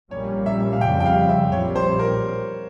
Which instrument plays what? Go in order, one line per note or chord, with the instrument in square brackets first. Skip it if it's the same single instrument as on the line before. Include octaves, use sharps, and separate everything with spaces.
[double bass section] A#1 A#2 G3 A#3 C#4 [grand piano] C#5
[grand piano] E5
F5
[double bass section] F2 C#3 G3 C4 [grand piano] G5
[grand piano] G5
F5
E5
[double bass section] A#1 A#2 G3 C4 [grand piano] C#5
[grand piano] C5
A#4